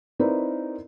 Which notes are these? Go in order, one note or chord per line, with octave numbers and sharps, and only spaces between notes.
C4 D#4 E4 A#4 B4 D5